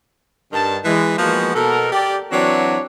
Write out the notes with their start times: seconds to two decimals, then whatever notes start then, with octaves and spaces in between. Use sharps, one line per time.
0.52 G2 D#3 A5
0.85 E3 G#3
1.18 F3 G#3 A#3 B3 F#4
1.54 B2 A4 A#4
1.92 G4 D5
2.31 E3 F#3 C4 D4 F#4 C#5